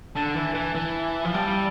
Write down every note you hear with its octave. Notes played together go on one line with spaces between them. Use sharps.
D3 A5 E6 A6 E7
E3
E3
E3
F3
G3 A5 E6 A6 D7 G7